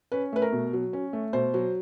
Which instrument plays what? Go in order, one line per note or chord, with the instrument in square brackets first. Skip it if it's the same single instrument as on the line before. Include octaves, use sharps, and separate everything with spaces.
[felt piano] C#4 B4
A3 B4
A#4
B2
F#3
C#4
A3
B2 C5
F#3